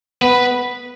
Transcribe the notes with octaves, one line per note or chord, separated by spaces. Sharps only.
B3 B4